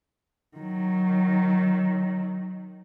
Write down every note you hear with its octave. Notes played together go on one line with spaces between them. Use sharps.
D#3 F#3